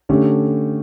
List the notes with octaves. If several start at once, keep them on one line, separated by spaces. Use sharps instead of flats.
D3 A3 C#4 G4